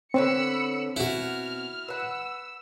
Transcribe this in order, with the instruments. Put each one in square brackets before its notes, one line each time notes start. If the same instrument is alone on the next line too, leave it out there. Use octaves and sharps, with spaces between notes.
[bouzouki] D3 B3 C#5 [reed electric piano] C4 [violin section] B5 E6 C#7
[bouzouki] B2 [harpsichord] E4 F#4 [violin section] F6
[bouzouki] B4 F#5 [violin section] E6